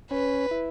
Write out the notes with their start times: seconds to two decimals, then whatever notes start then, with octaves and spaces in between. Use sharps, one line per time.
0.11 C#4 B4
0.51 E4